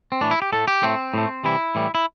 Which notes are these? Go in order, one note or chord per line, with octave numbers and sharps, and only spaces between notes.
C4
A2 E3 A3 D4
E4
G4
A2 A3 A4
G4
A2 A3 C4
A2 A3
C3 E3 G3 E4
A2 E3 G3
E4